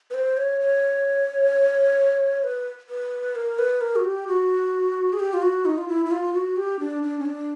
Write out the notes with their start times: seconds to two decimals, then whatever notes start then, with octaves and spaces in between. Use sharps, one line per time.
0.10 B4
0.14 C5
0.37 C#5
0.60 C#5
2.44 B4
2.89 B4
3.35 A#4
3.59 B4
3.81 A#4
3.96 F#4
4.05 G4
4.28 F#4
5.13 G#4
5.20 G4
5.34 F4
5.42 F#4
5.65 D#4
5.78 F4
5.88 E4
6.05 E4
6.11 F4
6.34 F#4
6.57 G4
6.80 D4
7.03 D4
7.19 C#4
7.25 D4